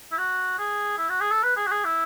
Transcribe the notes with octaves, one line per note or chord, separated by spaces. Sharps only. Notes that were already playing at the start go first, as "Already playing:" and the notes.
E4
F#4
G#4
E4
F#4
G#4
A4
B4
G#4
F#4
G#4
E4